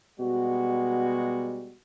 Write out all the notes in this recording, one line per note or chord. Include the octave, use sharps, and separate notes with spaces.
B2 G3 G#3 F#4